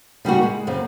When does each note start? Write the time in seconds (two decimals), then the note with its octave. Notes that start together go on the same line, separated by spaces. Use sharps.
0.25 C#3 G3 A#3 F#4
0.43 G#3
0.67 F#2 C#3 A#3 C4